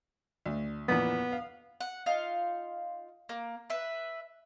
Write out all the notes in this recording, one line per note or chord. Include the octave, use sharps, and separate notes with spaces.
D2
F2 A#2 E3 B3
F5
F#5
D#4 F4 F5
A#3
B4 E5